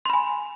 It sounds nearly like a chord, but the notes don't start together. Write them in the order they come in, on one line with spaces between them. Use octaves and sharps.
C6 B5 G#5